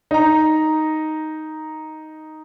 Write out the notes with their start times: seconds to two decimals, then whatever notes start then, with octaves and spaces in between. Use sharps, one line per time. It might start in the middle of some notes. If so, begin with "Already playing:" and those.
0.11 D#4 A#5